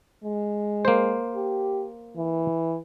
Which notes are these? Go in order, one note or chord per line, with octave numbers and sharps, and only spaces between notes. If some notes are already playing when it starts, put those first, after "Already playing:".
G#3
A#3 C5
G4
E3